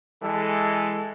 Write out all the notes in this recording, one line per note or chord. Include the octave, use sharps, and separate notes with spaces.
E3 G#3 A4